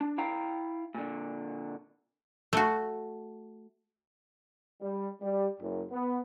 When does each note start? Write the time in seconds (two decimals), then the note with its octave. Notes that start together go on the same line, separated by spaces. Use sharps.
0.01 D4
0.18 E4 F5 G5 A#5
0.95 A#2 D3
2.53 A3 F#4
4.81 G3
5.21 G3
5.60 F#1
5.90 B3